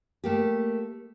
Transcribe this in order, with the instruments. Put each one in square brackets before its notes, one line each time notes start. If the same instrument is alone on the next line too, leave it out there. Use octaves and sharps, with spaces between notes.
[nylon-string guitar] A3 A#3 G4